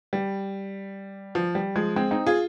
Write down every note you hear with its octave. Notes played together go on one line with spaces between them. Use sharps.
G3
F3
G3
F3 G#3
G#3 C4
C4 D#4
F4 G#4